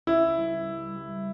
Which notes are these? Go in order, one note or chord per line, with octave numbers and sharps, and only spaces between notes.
C#2 E4
G3
G3
G3